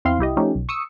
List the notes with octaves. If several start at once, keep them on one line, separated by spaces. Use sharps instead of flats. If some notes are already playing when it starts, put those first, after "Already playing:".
E2 C4 E4 F5 C6
C2 E4 G4 D#5
F3 A3 C#4 D#4 G4
B1
C#6 D#6 E6 C#7